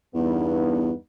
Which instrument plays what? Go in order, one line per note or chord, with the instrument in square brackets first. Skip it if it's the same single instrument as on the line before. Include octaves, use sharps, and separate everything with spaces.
[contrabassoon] E2 [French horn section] G2 B3 D#4